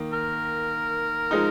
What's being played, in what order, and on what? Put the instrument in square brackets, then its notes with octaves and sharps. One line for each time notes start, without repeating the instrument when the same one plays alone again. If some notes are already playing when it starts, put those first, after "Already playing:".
Already playing: [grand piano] D#3 A#3
[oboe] A#4
[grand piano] F3 G#3 D#4